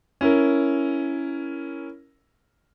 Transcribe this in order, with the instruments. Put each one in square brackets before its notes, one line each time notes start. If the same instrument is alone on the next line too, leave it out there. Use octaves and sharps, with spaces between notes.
[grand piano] C#4 E4 A#4